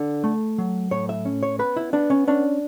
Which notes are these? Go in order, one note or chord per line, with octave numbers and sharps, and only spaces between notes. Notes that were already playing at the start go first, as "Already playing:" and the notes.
Already playing: D3
A3
F#3
A2 C#5
E5
C#4
C#5
B3 B4
E4
B3 D4
C#4
C#4 D4